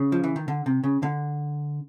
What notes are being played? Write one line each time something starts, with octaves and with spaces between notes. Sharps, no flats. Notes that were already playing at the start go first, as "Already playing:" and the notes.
Already playing: C#3
F3
E3
D#3
D3
C3
C#3
D3